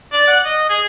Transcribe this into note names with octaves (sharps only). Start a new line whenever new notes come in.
D5
F#5
D#5
G#4